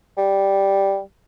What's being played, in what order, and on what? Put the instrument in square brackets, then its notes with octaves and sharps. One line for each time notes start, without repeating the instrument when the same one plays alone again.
[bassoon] G3